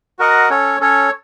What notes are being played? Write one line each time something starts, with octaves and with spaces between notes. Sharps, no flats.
F#4 A#4 D#5 F#5
C#4 A4 C#5
C#4 A4 C#5